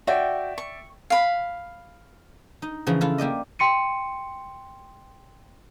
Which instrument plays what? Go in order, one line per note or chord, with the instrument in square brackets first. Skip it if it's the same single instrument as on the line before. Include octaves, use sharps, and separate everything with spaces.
[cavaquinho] F#4 G5 [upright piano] D5 E5
[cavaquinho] C#6
F5 B5
[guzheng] D#4
C#3 E3 F3 A#5
E4 F4 A4
A#3 G4 D5 D#5
[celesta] G5 C6 C#7 D#7